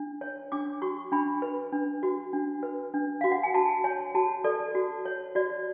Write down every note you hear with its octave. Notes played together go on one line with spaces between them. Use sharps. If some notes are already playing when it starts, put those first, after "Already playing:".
Already playing: D4
C#5
D4 D6
F#4 C#6
D4 B5
B4
D4
F#4
D4
B4
D4
F#4 F5
F#5
G#5
F#4 A5
C#5 G#5
F#4 A5
A4 D5
F#4
C#5
F#4 D5